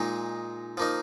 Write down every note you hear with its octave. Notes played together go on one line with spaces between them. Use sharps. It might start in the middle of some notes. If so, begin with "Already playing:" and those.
Already playing: A#2 G#3 D#4
F3 A#3 D#4